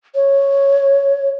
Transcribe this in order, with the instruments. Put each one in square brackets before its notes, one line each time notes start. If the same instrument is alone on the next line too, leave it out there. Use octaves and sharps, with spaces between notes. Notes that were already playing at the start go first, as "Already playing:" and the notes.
[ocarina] C#5